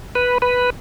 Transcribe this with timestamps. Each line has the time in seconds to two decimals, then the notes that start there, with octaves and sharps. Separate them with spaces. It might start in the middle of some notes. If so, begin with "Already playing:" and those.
0.15 B4
0.42 B4